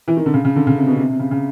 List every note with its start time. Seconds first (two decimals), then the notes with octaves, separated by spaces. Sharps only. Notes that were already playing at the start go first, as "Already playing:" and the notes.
0.08 E3
0.17 D#3
0.26 D3
0.34 C#3
0.45 C#3
0.56 D3
0.67 C#3
0.77 C3
0.87 B2
0.99 C3
1.09 C3
1.20 C#3
1.31 C#3